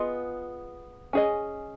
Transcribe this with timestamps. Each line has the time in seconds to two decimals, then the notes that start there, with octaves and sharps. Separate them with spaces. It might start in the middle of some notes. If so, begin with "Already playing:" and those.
Already playing: B3 F4 G#4 D#5
1.13 C#4 G#4 D#5